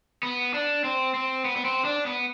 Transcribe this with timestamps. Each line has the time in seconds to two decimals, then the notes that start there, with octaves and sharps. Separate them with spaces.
0.23 B3
0.54 D4
0.84 C4
1.14 C4
1.45 B3
1.56 B3
1.65 C4
1.85 D4
2.06 B3